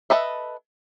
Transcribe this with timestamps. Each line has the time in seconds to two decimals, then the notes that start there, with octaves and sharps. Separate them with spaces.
0.10 A4 B4 D#5 E5